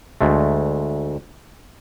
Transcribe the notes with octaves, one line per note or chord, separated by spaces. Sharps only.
D2 G#3 A3